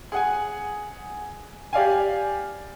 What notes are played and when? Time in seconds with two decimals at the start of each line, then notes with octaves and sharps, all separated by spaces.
0.12 G#4 F#5 G#5
1.73 G4 D5 F5 G#5